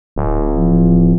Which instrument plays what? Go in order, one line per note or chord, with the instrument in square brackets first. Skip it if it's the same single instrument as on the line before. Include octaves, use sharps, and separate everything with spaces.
[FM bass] D1
[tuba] F3